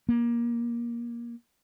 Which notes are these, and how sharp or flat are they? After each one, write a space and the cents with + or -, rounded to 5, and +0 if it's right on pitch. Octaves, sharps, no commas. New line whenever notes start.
A#3 +20